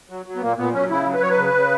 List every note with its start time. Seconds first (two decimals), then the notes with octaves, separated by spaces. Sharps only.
0.10 F#3
0.26 F#3
0.36 B3
0.41 A#2 A#3
0.58 A#2 B3
0.73 F#3 C#4
0.90 C#3 E4
1.06 F#3
1.14 B4
1.22 F#3 C#5
1.30 B4
1.38 C#3
1.54 C#3